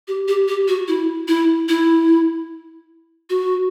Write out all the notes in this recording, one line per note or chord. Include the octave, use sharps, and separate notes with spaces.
G4
G4
G4
F#4
E4
E4
E4
F#4